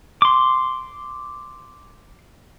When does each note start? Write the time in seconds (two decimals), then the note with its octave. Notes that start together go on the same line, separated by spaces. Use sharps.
0.22 C6 D6